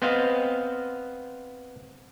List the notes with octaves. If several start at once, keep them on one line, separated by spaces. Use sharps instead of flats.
B3 C4 C5 D#5 F5